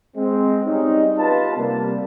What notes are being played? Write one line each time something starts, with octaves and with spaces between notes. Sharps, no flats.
G#3 C4
G3 C4 C#4 D#4
B3 F4 G4 B4 A5
C3 G3 A#3